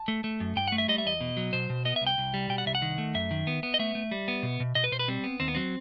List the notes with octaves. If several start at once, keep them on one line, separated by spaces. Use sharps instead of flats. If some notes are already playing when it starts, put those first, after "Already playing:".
Already playing: A5
A3
A3
F#2
G2 G5
A3 F#5
E5
G3 D#5
E5
E2 D#5
B2
F#3
B2 C5
B2
B3 D#5
E5
C2
G5
C2
G3
B2 G5
F#5
C2 E5
F#5
D#3
A3
F#2 E5
D#3
B3
B3
D#5
A3 E5
A3
G3
B3
B2
B2
B2 D#5
B4
B2 C5
B4
G3 C4
B3
D#2 C4
B3
F#3 C4